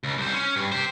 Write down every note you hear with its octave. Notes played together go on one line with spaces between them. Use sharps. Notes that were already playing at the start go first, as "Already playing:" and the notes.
C#2
C2 C5
C#4
G2
G4 C5